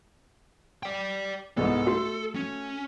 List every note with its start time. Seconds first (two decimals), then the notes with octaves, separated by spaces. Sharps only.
0.83 D5 G5
1.57 C2 G#2 B3 A4
1.87 A3 F#4
2.36 C#4